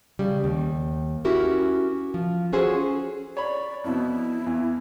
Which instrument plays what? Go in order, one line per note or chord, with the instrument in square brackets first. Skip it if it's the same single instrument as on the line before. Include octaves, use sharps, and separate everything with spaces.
[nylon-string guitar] C#3 G3
D#2
C#4 E4 F#4 G4 A#4
F3
C#4 F4 F#4 G#4 A4 C5
[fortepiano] C#5 B5 [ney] D5
[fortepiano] F2 B2 [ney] E4
[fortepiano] E2